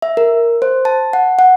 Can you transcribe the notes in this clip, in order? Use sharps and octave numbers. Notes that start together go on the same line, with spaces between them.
E5
A#4
C5
A5
F#5
F#5